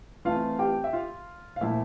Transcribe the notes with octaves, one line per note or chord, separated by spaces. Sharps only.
E3 A3 C4 F4 F5
G4 G5
E5
F4 F5
F5
A#2 F3 A3 E4 E5